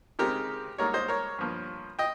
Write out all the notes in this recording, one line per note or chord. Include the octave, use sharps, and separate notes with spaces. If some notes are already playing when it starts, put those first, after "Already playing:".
C#3 G#3 C4 D#4 G4 A#4
G#2 G3 A#3 D#4 A#4 C#5
C5 D#5
A#4 C#5
G2 F3 A#3
D#5 G5